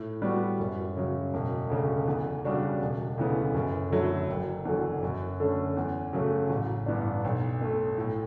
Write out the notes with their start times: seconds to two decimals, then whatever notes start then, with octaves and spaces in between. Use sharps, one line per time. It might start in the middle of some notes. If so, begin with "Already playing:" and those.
Already playing: A2
0.22 G3 B3 F#4
0.60 F#2
0.97 C#3 F#3
1.34 E1
1.70 D2 C#3
2.07 E2
2.44 C#3 G3 D4 F#4
2.80 E1
3.18 D2 C#3 E3 B3
3.54 F#2
3.91 D3 F#3 A3 E4
4.28 F#1
4.65 E2 D3 F#3
5.02 F#2
5.40 D3 A3 C#4
5.77 E2
6.13 C#3 F#3 A3
6.49 A1
6.86 G2 E3 B3 D4
7.24 B1
7.61 B2 A3
7.98 A2